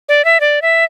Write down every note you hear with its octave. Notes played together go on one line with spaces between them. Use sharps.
D5
E5
D5
E5